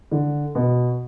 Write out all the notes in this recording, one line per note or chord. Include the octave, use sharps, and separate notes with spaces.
D3
B2